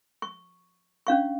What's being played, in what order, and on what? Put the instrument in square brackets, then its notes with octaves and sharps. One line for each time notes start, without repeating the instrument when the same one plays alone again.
[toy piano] C#6
C#4 D4 F5 C#6